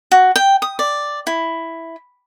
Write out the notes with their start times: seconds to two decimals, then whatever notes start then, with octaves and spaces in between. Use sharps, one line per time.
0.11 F#4
0.36 G5
0.62 D#6
0.79 D5
1.27 E4